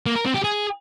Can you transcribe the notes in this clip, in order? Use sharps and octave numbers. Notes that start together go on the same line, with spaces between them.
A#3
A#4
C4
G4
G#4